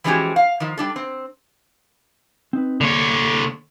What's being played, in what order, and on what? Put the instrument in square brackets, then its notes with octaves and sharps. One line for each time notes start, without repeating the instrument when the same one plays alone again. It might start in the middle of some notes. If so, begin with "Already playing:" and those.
[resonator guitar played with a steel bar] E3 F3 G#3 C#4 F#4 G4
F5
D#3 F3
G3 D4 A4
C4
[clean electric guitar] C4 D#4 B4
[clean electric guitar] C2 A#3 D5 [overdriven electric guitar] D3 C#5